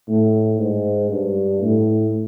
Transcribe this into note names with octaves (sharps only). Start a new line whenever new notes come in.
A2
G#2
G2
A2